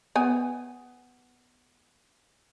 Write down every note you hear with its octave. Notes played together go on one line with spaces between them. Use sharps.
B3 G#5